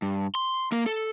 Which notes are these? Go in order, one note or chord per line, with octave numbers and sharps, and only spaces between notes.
G2
C6
A#3 A#4
A4